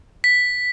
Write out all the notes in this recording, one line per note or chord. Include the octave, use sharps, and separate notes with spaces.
B6